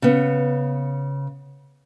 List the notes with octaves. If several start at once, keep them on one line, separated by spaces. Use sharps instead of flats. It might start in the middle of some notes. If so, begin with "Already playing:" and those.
C#3 B3